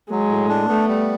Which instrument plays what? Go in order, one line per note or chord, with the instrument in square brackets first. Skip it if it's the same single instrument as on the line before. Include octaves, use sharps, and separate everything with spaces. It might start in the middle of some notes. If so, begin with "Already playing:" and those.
[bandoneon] F#3 [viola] G#3
[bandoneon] A2
D4
[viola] A3 [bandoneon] B3
[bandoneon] G3